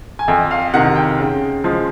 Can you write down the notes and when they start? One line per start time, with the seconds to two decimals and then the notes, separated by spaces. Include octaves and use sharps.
0.19 G#5
0.28 F2 G5
0.51 F5
0.74 C3 D#3 F#5
0.96 G5
1.20 C#3
1.64 F3 G#3